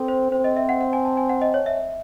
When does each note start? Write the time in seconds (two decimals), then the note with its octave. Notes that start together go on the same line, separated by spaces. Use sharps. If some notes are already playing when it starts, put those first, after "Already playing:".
Already playing: C4 A4
0.08 C5
0.32 C4 C5
0.44 D#5
0.57 E5
0.69 F#5
0.81 F#5
0.93 G#5
1.05 A5
1.17 G#5
1.29 F#5
1.41 D#5
1.54 C#5
1.66 E5